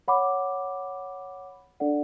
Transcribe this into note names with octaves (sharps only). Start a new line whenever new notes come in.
C#5 F#5 B5 D6
D4 A4 D5 F#5